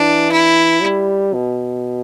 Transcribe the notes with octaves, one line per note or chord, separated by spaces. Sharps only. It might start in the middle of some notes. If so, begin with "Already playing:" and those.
Already playing: E3 D4
E4
G3
B2